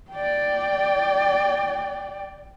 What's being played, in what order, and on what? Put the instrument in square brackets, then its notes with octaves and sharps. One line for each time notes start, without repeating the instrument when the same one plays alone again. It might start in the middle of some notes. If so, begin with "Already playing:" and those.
[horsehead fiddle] D5 G5